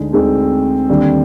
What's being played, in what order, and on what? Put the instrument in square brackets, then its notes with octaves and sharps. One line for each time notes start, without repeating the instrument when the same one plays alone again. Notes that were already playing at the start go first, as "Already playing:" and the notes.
Already playing: [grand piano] D2 D3 G#3 D#4
[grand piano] D2 D3 G#3 D#4 [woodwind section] C4
[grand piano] D#2 D3 G3